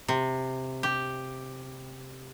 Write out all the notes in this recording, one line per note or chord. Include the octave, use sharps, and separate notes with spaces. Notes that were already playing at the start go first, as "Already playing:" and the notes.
C3
G4